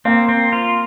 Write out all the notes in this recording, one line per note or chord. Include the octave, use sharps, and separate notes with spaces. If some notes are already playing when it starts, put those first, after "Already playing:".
A#3 C4
C4
F4